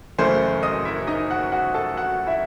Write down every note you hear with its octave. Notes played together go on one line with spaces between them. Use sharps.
F#1 F#2 E3 A3 C5 C6
D#5 D#6
E4 E5
D#4 D#5
F#4 F#5
F#4 F#5
A4 A5
F#4 F#5
E4 E5